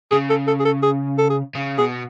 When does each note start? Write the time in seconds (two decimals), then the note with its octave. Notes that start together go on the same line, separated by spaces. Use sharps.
0.12 C#3 G#4
0.30 A4
0.48 A4
0.60 G#4
0.66 A4
0.83 G#4
1.19 A4
1.30 G#4
1.55 C#3
1.78 B2 G#4